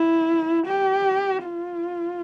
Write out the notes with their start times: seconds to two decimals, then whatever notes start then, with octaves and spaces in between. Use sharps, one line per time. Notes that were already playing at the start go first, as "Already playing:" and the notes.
Already playing: E4
0.67 G4
1.45 F4